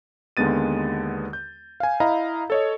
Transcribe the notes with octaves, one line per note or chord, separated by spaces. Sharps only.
D#2 D3 G#3 B3 A6 D#7
G6
F5 G#5
E4 D#5 F5 A#5 B5
A4 C#5 D#5